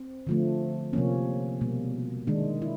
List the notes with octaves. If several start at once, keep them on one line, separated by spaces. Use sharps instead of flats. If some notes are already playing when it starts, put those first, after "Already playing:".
Already playing: C4
D3 F3 A3
C3 F3 A#3 C#4
B2 G3 A#3
D#3 G#3 D4
E4